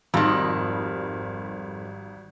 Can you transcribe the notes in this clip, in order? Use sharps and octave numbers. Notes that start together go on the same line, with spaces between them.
G#1 F2 D#3 G3 B5